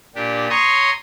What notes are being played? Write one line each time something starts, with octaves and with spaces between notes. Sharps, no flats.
A#2 D4 G4
C#5 A#5 C6 C#6 D#6